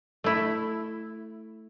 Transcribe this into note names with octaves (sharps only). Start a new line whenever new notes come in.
A3 E4